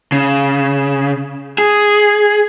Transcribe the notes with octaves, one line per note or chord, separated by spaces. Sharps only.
C#3
G#4